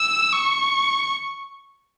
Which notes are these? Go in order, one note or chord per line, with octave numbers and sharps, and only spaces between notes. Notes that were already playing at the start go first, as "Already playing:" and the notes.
Already playing: E6
C#6